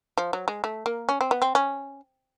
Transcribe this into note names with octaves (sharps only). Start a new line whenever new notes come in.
F3
F#3
G#3
A3
A#3
C#4
C4
B3
C4
C#4